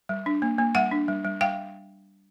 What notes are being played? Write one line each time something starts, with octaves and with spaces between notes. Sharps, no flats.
G3
D4
A#3
A#3
G3 E5 F#5
D4
G3
G3
G3 F5 G5